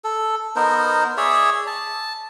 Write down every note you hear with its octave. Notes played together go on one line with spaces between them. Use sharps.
A4
B3 D#4 A#4 C5
G#4 C#5 D5 E5
A5